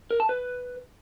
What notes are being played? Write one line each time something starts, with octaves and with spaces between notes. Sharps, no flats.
A#4
A5
B4